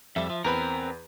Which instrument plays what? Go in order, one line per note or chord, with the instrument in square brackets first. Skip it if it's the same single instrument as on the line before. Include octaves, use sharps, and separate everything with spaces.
[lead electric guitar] F2 G3 [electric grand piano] E5
[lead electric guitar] F3
[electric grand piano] E2 B4 B5 [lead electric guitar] C4 A#4